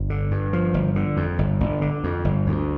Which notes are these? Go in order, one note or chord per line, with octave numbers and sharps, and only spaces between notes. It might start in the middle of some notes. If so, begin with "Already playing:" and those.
Already playing: G1
D3
G2
F3
G1
D3
F2
G1
G1
D3
F2
G1
D2